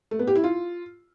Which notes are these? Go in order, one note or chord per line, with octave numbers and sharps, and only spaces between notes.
A3
B3
G4
E4
F4